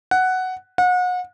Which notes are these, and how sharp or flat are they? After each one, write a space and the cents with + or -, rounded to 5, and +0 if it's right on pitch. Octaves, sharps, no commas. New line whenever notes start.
F#5 +5
F#5 -35